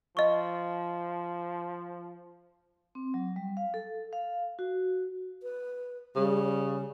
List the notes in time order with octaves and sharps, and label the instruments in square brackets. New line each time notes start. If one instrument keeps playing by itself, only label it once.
[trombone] F3 [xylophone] D#5 C#6
[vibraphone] C4
F#3
G3
F5
A4
F5
F#4
[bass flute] B4
[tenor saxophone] C#3 [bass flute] G3